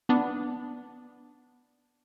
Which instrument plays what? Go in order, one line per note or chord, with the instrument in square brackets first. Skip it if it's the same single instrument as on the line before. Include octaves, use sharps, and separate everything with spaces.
[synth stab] B3 D4